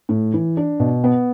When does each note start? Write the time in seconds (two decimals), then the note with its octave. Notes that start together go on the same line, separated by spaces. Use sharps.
0.09 A2
0.34 E3
0.57 D4
0.80 B2
1.04 B3